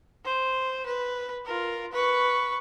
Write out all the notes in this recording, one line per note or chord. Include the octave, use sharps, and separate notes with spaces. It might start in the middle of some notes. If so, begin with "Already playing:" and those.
C5
B4
F4 A#4
B4 C#6